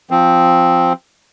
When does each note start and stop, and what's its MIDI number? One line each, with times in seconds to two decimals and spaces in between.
0.11 0.93 53
0.11 0.93 60